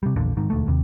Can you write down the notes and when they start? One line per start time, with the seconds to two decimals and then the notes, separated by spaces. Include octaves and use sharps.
0.03 C3 G3
0.16 A#1 E2 A#2 D3
0.37 G#2 D#3
0.50 E1 D2 A3
0.68 D#2 C3